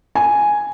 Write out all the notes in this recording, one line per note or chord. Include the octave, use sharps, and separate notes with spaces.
G#5